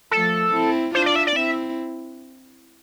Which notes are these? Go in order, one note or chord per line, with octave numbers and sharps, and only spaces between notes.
F3 A3 A4
C4 E4
D4 F4 C5
D5
E5
D5
C4 E4 E5